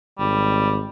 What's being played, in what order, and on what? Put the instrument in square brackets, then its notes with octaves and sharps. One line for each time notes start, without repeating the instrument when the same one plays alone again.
[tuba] G#1 [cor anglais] G3